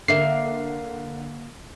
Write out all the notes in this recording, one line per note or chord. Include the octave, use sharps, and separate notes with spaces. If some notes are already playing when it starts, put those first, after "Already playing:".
D3 A#3 E5 C7